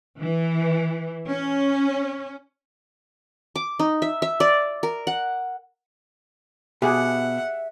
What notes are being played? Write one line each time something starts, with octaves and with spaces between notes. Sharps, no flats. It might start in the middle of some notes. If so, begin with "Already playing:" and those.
E3
C#4
D6
D#4
E5
E5
D5
A#4
F#5
B2 G4 G#4 E5 F#5